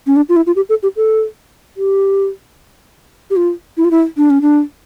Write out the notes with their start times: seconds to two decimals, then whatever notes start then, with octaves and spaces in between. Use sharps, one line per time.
0.07 C#4
0.16 D4
0.29 F4
0.36 E4
0.47 F4
0.56 G4
0.69 A4
0.83 G4
0.96 A4
1.77 G4
3.30 G4
3.36 F4
3.77 E4
3.85 F4
3.91 E4
4.17 D4
4.30 C#4
4.42 D4